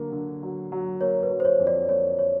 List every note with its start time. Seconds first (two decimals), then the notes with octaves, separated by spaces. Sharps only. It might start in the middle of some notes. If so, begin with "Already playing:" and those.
Already playing: D3 F#3 A#3
0.12 D3
0.43 F#3
0.72 F#3
1.01 A#3 C#5
1.23 B4
1.31 F#3
1.40 C5
1.45 C#5
1.59 F2
1.67 D5
1.88 A#3 C#5
2.19 C#5